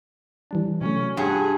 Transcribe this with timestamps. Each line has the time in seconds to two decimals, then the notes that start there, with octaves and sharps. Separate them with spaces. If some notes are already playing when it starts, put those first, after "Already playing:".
0.51 E3 G3 D4
0.81 C3 F#3 A3 C#4
1.17 G2 F4 G#4 F#5